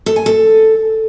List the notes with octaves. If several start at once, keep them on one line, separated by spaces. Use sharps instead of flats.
A4
G#5
A4